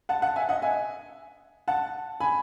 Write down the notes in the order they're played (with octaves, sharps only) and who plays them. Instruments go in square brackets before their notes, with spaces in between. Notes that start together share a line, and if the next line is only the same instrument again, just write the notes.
[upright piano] F#5 A5
F#5 A5
E5 G#5
D#5 F#5
E5 G#5
F#5 A5
G#5 B5